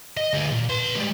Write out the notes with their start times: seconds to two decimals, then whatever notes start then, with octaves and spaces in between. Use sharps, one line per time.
0.17 D#5
0.33 D2 G#4
0.52 A#2
0.69 B4 C6
0.96 G3 G#3